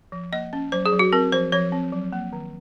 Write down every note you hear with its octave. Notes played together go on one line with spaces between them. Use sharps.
F3
A#3 D#5
C#4
F#3 C5
G#4
F#3
F#4
C4 A#4
F3 C5
F3 C#5
C4
F#3
A#3
D#3